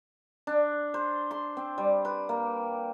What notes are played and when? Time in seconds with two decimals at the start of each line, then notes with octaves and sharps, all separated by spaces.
0.47 D4
0.94 C5
1.31 C6
1.57 C4
1.78 G3
2.05 B4
2.29 A#3